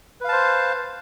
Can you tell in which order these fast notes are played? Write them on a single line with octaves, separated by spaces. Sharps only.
B4 F5 A5 C5